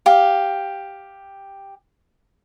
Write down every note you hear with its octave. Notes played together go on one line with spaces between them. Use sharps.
G4 F5